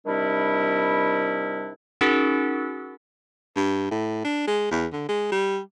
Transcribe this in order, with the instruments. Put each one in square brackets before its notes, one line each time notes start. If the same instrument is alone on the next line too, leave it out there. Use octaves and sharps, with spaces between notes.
[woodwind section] C3 D#3 G3 D4 E4
[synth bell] C#4 D#4 F#4 G#4 A#4
[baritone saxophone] G2
A2
D4
G#3
E2
D3
G#3
G3